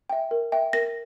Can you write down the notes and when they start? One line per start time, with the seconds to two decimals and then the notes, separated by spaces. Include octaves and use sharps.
0.10 E5 G5
0.31 A#4
0.52 E5 G5
0.73 A#4 A#6